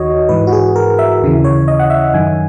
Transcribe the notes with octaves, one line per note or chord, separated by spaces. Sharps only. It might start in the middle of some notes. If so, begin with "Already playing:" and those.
Already playing: D#2 D#3 F#4 C#5 D#5
G#2 E3 B4
F#4
G#4
A#4
E5
D#2 C#3 E3
C#5
D#5
F#5
E5
F#2 D#3 G#5